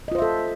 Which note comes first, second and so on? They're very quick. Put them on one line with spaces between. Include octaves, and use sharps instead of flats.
D#5 F4 C5 E5 A4